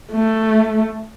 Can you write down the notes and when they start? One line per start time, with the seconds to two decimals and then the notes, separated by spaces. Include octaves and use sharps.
0.12 A3